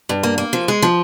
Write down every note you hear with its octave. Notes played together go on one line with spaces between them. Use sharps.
G2
A#3
A#3
F3
G#3
F3